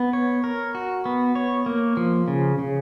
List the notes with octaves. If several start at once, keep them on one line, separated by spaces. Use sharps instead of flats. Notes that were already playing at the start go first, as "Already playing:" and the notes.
Already playing: B3
C#5
A#4
F#4
B3
C#5
A#3
F3
C#3
C#3